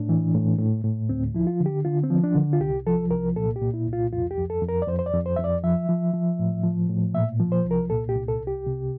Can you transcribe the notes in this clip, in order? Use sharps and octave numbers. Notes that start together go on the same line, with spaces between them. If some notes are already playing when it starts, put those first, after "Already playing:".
Already playing: A2 D4
E3
A2
A2
A2
D2 C4
F3 E4
F4
D3
G4
D3 F4
C4
F3
D4
D3
F4
C2 G4
F3 A4
C2 A#4
A#2 A4
G4
A#2
E4
C2
F4
F2 F4
G4
F2
A4
F2
A#4
D5
F2 C5
C5
D5
F2
C5
F2 E5
D5
F3 E5
F3
F3
A2
F3
A2
A#2 E5
F3
C5
C2
A#4
A#2 A4
G4
C2
A4
C2
G4
C3